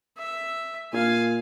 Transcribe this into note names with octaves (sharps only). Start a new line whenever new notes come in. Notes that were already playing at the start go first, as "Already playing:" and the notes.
E5
A#2 F5 G#5